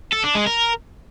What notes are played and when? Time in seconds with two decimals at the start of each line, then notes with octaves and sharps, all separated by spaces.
0.13 A4
0.24 D4
0.35 G#3
0.46 A#4